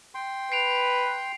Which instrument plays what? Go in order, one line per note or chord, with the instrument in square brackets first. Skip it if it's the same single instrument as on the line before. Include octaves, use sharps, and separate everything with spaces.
[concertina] G5 C6
[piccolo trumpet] B4 [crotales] C7 D7 F7